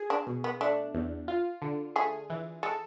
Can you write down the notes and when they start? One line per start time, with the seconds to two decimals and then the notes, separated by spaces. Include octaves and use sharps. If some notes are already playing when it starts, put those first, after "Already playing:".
Already playing: G#4
0.10 D4
0.27 B2
0.44 B3
0.61 A3 D4
0.94 E2
1.28 F4
1.62 D3
1.96 A3 G#4
2.30 E3
2.63 G#3 A4